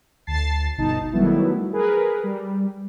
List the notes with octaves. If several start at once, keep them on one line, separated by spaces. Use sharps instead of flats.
D2 A5 A6 C7
G1 B2 D#4 A5
D#3 F#3 G3 A3 B3 E4
G#4 A#4 B4
G3